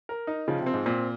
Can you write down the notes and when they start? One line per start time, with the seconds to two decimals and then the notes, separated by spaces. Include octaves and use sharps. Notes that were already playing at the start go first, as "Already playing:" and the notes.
0.09 A#4
0.27 D#4
0.48 C#3 F3
0.61 C3
0.66 C4
0.74 G#2
0.86 A#2 C4